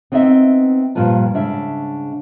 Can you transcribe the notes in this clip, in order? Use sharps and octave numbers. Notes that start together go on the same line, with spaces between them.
B3 C4 D#4 D#5 E5
G2 A#2 F3 F4 B4 A5
G#2 C#3 D4 E5